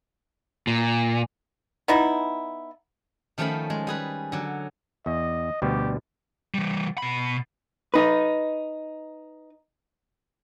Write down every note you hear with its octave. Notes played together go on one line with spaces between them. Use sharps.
A#2
B3 D#4 E4
D#3 F3 A3 C#4 F5 B5
G#3
G3 G#4 B4
D3 F#3
E2 D#5
D2 B2 G3 G4
E3 G3
B2 B5
D#4 B4